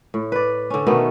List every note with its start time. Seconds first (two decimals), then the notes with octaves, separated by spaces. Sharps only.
0.14 A2
0.32 B4 D5
0.70 D3 C#4
0.87 B2 D#3 A3 B3